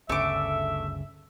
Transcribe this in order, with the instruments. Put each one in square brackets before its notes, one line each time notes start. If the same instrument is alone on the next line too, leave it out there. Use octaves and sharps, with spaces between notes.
[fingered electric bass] G1 D2 C#3 [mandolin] A3 D6 [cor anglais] E5